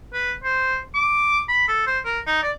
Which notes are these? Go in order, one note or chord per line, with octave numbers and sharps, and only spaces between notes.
B4
C5
D6
B5
A4
C5
A#4
D#4
D5